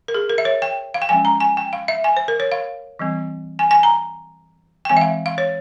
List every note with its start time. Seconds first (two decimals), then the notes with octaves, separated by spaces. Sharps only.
0.08 A#4
0.15 G#4
0.30 A#4
0.38 E5
0.45 C#5
0.62 G5
0.94 F5
1.02 G5
1.09 F3 G#3 C#4 G#5
1.25 A#5
1.40 G#5
1.57 G5
1.73 F5
1.88 E5
2.04 G#5
2.17 C5
2.28 A#4
2.40 C#5
2.52 F5
2.99 E3 G3 C4
3.59 G#5
3.71 G#5
3.83 A#5
4.85 G5
4.89 E3 G#3 C4 G#5
4.97 E5
5.01 F5
5.26 F5
5.38 C#5